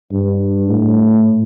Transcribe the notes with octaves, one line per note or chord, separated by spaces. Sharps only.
G2
A2